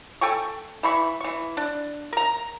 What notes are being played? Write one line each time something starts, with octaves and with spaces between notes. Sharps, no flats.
A4 G5 G#5 C#6
E3 B5 C#6
E3 C#6
D4
A#4 A#5